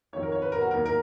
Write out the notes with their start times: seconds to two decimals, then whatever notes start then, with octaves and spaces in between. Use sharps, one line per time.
0.13 F2 D#3 F#3 C#5
0.23 A#4
0.32 C#5
0.42 B4
0.52 A#4
0.61 F#4
0.70 D#2 D#3 F#3 A#4
0.86 A#4